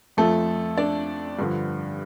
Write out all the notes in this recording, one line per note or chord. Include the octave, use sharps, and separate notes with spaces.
F2 F3 A3 A4
D4 D5
G2 D3 F3